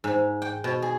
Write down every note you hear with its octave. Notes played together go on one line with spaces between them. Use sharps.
G#2
G5
B2
G#4